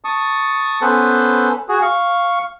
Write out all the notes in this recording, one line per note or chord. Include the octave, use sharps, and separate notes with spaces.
A5 C#6 D#6
B3 C#4 A4 B4 C5
F#4 G#4
F5 C#6